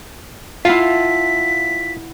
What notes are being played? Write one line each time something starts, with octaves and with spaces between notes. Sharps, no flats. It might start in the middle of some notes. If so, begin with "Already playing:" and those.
E4 F4 F5 F#5 A5 B6